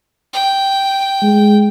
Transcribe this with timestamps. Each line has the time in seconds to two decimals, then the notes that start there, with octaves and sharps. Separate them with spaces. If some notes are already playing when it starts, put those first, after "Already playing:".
0.33 G5
1.22 G#3